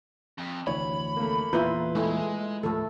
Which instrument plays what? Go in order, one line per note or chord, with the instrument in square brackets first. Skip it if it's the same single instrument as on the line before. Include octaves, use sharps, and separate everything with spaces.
[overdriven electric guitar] F2
[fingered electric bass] F1 D2 E3 [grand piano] C#5 [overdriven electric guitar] B5
[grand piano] A3 A#3
[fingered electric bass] E2 A#2 E3 [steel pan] E4 F4 [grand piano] B4 A#5 G6
[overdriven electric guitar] G#3 [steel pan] A3 E4
[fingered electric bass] D#2 A2 F3 [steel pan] A3 A4